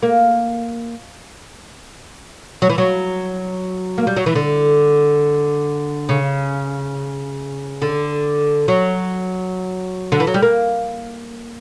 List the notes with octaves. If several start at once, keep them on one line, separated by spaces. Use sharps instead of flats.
A#3
F#3
E3
F#3
A#3
G3
F#3
E3
D3
C#3
D3
F#3
D3
E3
F#3
G3
A#3